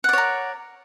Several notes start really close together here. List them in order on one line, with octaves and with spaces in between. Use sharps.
F#5 D5 C#5 A#4